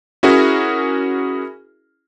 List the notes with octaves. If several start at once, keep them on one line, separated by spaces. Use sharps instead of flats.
C#4 E4 F#4 G#4 A#4